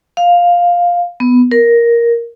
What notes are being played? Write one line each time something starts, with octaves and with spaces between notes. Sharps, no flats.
F5
B3
A#4